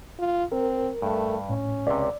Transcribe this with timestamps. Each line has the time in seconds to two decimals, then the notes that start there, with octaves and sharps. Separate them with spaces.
0.19 F4
0.52 C4 A#4
1.02 G2 A3
1.49 A2 C#4
1.87 C#2 C3 D5